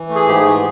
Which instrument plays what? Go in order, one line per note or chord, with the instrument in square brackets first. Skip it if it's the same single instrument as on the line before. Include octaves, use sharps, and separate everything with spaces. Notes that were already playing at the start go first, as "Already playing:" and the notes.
Already playing: [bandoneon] E3
A3
G#4
G#2 G4
G#4
E3